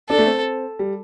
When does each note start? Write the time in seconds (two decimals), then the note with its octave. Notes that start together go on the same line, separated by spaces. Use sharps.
0.09 D4 A4
0.18 A3
0.27 C4
0.79 G3